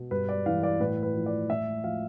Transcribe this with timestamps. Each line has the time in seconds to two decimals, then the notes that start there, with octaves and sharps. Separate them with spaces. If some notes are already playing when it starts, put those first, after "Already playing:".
Already playing: B2
0.11 G2 B4
0.29 D5
0.46 E3 F5
0.63 D5
0.80 A2 B4
1.03 B4
1.15 F3
1.26 D5
1.49 A2 E5
1.84 F3 F5